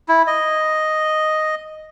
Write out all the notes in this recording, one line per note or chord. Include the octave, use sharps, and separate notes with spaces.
E4
D#5